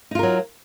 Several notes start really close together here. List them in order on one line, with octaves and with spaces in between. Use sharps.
D#4 F4 A#4 F#3